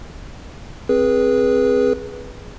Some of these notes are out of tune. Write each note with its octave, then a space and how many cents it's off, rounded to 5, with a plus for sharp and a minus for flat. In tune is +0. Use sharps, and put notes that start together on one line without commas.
C4 +5 G#4 +0 B4 -20